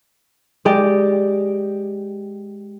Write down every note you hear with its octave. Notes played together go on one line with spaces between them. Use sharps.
G#3 G4 D5